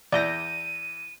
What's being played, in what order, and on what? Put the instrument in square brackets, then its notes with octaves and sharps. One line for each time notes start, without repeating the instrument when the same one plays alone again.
[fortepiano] E2 E4 [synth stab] D5 G6 A#6 [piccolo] D#7